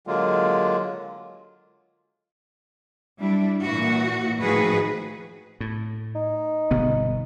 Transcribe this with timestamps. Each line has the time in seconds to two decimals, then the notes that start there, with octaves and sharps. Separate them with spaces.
0.07 D3 F#3 G#3 A#3 F4
3.19 G3 D4 E4
3.63 A#2 E3 F#4
4.40 A2 D#3 F3 F#4 G#4 B4
5.60 A2
6.15 D#4
6.71 G1 B2 B3